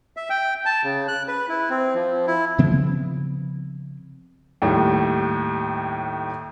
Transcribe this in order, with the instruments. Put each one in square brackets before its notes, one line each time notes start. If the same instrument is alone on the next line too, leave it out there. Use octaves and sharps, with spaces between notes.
[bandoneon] E5
G5
A5
C#3
F#6
B4
E4
C4
F3
E4
[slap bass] C#3 F3 B3 C4
[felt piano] D#2 A2 G3